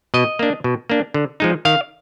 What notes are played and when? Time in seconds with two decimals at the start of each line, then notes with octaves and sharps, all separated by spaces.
0.14 B2 D#5
0.39 A#3 D4
0.64 B2
0.90 A#3 D4
1.14 D3
1.40 F3 G#3 D#4
1.65 D#3 F5